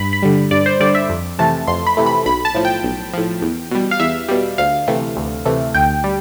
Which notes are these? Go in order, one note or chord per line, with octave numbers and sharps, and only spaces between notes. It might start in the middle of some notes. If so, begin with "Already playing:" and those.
Already playing: G2 B5
B5
D3 G3
G2 D5
C5
D3 G3 D5
E5
F2
C3 E3 A3 A5
F2 C6
B5
C3 E3 A3
B5
B1 B5
A5
A2 F3
G5
B1
A2 F3
E2
B2 G3
F5
E2 E5
B2 G3
D2 F5
C3 E3 A3
D2
C3 E3 A3
D2 G5
G3